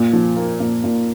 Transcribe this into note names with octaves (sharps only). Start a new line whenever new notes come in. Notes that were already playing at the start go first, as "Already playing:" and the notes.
Already playing: A#2
F3
A#3
A#2
A#2